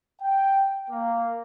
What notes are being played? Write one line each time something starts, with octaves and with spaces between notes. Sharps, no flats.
G5
A#3